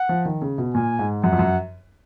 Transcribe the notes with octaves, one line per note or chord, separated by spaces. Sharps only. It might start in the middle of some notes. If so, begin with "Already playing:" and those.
Already playing: F#5
F3
D#3
C#3
B2
A#2 G#5
G#2
F#2 F#5
F2
F#2